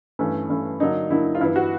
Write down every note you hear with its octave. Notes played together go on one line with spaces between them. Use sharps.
G2 E3 A3 C#4
G2 E3 A3 C#4
D3 F#3 A#3 D4 D#4
D3 F#3 A#3 D4 E4
F4
G2 E3 G3 B3 E4
F#4